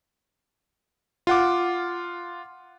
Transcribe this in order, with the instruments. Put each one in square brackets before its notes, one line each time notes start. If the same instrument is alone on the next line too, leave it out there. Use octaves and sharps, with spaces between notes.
[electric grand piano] F4 F#5 D6